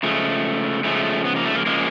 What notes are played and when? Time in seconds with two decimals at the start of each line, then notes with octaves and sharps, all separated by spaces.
0.03 C#3 F3 G#3 A3
0.84 C#3 F3 G#3 A3
1.25 B3
1.36 A#3
1.45 A3
1.55 A#3
1.66 C#3 F3 G#3 A#3